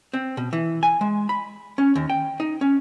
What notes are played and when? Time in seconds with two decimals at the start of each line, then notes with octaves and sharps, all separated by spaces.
0.14 C4
0.37 B2
0.53 E3
0.83 G#5
1.01 G#3
1.29 B5
1.78 C#4
1.95 D#2
2.10 G5
2.40 D#4
2.61 C#4